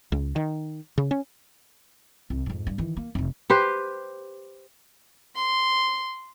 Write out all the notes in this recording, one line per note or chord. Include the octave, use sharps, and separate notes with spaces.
C#2
D#3
C#3
C#4
C2
F2 G#2
G2
D#3 E3
A#3
F1 F2
G4 B4 C5
C6